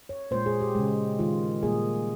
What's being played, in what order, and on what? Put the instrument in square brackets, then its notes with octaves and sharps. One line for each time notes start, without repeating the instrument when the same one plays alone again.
[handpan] C#5
A#2 G#3 C5
G#4
G4
C#3 G#3
D#3 G#3 F4
A#2 G3 A#3 G#4